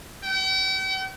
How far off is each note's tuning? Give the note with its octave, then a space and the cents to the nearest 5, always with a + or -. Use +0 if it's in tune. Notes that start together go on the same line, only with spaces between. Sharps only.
G5 -45